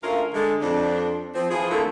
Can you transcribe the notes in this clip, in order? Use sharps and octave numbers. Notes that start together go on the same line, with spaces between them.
D2 C#4 F4 A#4 E5 F5
D3 G#3
F2 D4
F3 C4
E3 F3 F4 G#4
F2 D3 A3 A#3 E4